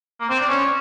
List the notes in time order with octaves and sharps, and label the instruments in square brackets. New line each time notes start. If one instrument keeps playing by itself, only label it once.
[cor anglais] A#3
C4
D4
C#4